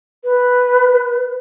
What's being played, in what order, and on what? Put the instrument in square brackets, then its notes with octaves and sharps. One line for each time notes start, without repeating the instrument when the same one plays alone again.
[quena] B4